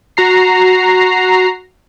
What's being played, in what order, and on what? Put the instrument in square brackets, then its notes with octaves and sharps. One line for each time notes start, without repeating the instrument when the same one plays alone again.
[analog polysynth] F#4 A#5 C7